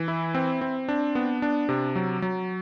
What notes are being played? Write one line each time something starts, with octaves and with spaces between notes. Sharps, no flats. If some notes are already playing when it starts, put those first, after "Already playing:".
Already playing: E3
E4
C4
C4
D4
B3
D4
C3
F#3
F#3